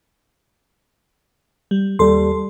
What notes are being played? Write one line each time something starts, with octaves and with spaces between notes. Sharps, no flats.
G3
D#2 G3 A4 C6